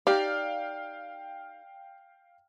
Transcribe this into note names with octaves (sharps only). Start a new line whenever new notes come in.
D#4 G4 D5 F5 G5 F6